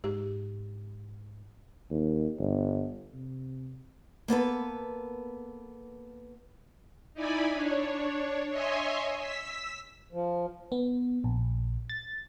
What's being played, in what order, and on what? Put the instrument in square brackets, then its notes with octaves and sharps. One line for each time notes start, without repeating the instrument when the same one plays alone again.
[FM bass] G#2 [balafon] G4
[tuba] D#2
G1
C3
[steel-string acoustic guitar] A#3 B3 A4 B4
[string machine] D#4 E4 D5 G#5 B5
D4 C#5
C#5 D#5 E5 G#5 C6
E6 B6
[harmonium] F3
[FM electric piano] B3
A#1
A6